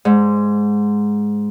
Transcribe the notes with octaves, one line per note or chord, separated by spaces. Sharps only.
G#2